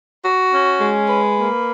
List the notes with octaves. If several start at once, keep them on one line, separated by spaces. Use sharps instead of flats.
F#4
C#4
G#3
B4
A#3